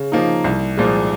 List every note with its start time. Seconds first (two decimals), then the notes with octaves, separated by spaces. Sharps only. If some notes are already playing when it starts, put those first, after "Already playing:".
Already playing: C#3
0.12 F3 A#3 D#4
0.44 C2
0.77 A#2 F3 G#3